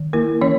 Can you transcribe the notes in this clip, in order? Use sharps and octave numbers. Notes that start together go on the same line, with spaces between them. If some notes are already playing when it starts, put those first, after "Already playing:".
Already playing: D#3
A#3 E4 A#4
E3 C#4 C#5